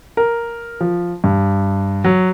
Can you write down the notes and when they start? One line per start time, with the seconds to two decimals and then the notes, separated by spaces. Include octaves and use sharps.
0.17 A#4
0.80 F3
1.24 G2
2.04 F#3